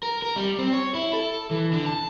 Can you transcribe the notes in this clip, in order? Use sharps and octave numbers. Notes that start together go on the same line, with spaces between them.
A#4
A#4
G3
C4
C#5
E4
A4
E3
D3
A5